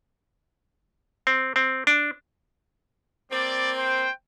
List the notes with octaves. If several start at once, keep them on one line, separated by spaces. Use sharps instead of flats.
C4
C4
D4
G3 A#3 C4 D5
C5 G5